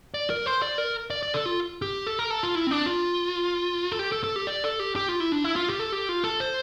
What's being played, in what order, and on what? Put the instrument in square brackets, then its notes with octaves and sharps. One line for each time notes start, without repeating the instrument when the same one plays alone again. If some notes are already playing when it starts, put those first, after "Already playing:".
[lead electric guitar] D5
A#4
C5
D5
A#4
D5
D5
A4
F4
G4
A4
A#4
A4
F4
E4
C4
D4
F4
A4
G4
A4
A4
G4
D5
A4
G4
G4
F4
E4
D4
E4
F4
G4
A4
G4
F4
A4
C5